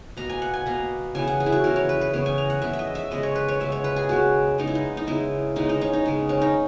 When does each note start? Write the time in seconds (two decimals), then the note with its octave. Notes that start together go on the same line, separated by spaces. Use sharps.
0.17 B2 A#3 A#5
0.30 G#5
0.42 F#5
0.54 G#5
0.66 B2 A#3 A#5
1.15 C#3 E3 B3 G#5
1.28 F#5
1.40 G#4
1.46 E4
1.52 F#4
1.64 C#3 E3 B3 A#4
1.76 C#5
1.89 B4
2.01 B4
2.13 C#3 E3 B3 C#5
2.26 G#5
2.38 A#5
2.50 F#5
2.62 C#3 E3 B3 E5
2.73 E5
2.79 D#5
2.95 E5
3.11 C#3 G#3 B3 D#5
3.23 C#5
3.36 B4
3.48 C#5
3.60 C#3 G#3 B3 E5
3.72 C#5
3.84 B4
3.96 G#4
4.09 C#3 G#3 B3 F#4
4.58 C#3 G#3 B3 D#4
4.67 E4
4.75 D#4
4.97 D#4
5.07 C#3 G#3 B3 E4
5.56 C#3 G#3 B3 D#4
5.69 D#4
5.81 C#4
5.93 D#4
6.06 C#3 G#3 B3
6.29 C#4
6.42 D#4